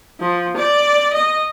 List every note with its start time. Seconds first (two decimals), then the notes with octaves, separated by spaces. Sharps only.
0.20 F3
0.56 D5
1.13 D#5